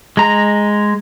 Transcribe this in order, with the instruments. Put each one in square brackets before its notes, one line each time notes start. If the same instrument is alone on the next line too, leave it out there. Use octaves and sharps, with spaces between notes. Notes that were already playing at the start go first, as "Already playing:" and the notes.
[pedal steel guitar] G#3 A#5